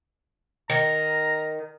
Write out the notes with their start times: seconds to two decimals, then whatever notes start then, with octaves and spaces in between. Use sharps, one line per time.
0.70 D#3 A#5